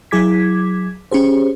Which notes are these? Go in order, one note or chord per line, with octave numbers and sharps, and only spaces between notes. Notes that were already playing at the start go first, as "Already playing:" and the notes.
F#3 E4 G#4 D6 G#6 B6
C#4 G4 G#4 C5